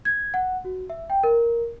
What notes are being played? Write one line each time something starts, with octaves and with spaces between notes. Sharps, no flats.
G#6
F#5
F#4
E5
G5
A#4